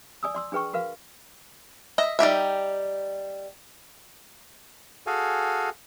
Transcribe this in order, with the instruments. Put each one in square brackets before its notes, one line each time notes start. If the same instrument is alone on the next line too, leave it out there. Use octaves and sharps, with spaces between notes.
[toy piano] D5 G#5 D#6 E6
D5 C6 E6
D4 G#4 B4 G5 C#6
F#4 A#4 B4 F5
[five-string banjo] D#5 E5
G3 D#4 G4 E5
[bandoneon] F#4 G#4 A4 F5 G#5